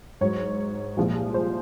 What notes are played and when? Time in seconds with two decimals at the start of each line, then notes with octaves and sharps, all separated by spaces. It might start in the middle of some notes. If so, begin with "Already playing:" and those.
0.21 G#2 F#3 C#5
0.97 C2 A#2 F3 G#3
1.34 C5